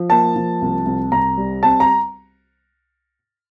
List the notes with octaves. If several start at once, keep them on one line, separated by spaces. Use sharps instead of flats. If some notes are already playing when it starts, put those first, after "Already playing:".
Already playing: F3
A#3 A5
F3
C2
C2
C2 A#5
G3
C4 A5
A#5